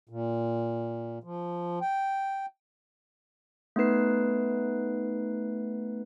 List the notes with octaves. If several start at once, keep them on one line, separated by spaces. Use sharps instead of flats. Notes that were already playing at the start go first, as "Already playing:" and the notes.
A#2
F3
G5
A3 B3 D#4 B4 C7